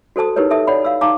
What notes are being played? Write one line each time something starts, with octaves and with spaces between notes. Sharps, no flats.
F#4 A4 C5 A5 D#6
D#4 E4 G4 A#4 B4 C#5
A4 E5 A5 D#6
C#5 D5 F#5 B5
F5 F#5 E6
D#4 F5 A5 A#5 D6